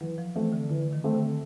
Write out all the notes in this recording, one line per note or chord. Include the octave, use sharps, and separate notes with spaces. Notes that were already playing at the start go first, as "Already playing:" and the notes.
E3 F#3
F3
E3 A3 C4
D3
D3 E3
D#3
A3 C4
D3